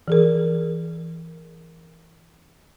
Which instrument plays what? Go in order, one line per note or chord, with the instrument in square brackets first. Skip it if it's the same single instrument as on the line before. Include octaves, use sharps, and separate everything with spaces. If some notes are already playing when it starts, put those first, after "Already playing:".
[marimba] E3 G#4 A#4